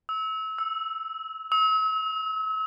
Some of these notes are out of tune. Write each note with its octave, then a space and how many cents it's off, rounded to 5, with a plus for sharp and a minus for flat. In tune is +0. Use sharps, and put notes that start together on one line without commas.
E6 -30
E6 +0
E6 -40